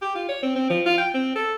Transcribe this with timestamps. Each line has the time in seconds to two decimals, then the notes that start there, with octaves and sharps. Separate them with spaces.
0.02 G4
0.15 F4
0.29 C#5
0.42 C4
0.55 C4
0.70 F3
0.86 F4
0.97 G5
1.14 C4
1.35 A4